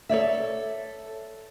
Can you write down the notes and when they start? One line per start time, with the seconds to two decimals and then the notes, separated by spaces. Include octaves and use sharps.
0.09 A4 C#5 D5 E5